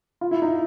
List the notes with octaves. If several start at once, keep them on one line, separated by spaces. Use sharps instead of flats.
F4
E4
D#4